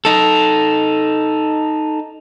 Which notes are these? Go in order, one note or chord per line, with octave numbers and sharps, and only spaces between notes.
D#4 A4